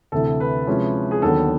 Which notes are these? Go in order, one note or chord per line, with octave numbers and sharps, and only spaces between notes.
D2 C3 E3 A4
B4
C3 F3 G#3 C#4 E4
G#4
D#2 D3 F#3 B3 A4